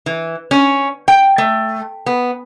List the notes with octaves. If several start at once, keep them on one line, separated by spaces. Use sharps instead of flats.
E3
C#4
G5
A3
B3